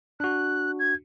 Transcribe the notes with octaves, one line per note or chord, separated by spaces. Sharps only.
D4 F#4 F#6
G#6